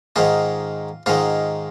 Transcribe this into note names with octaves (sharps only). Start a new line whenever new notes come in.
G#2 D#3 G#3 F4
G#2 D#3 G#3 F4